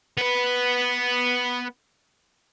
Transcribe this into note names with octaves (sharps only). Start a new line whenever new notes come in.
B3 B4